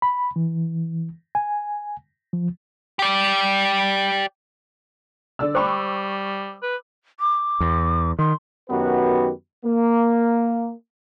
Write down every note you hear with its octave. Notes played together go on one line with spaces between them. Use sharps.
B5
E3
G#5
F3
G4 D5
D3 D5 E6
G3 C5 G5 B5 C#6 D6
B4
D6
E2
D#3 C6
F#2 D#3 B3 F#4 G4 B4
A#3